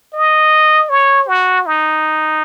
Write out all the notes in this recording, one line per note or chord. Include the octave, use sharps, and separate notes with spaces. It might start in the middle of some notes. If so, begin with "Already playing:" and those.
D#5
C#5
F#4
D#4